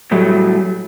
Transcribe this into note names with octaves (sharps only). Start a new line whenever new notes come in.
A2 F#3 G3 A3